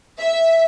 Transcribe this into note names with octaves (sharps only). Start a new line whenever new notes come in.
E5